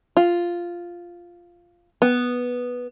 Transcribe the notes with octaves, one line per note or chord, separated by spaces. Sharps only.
F4
B3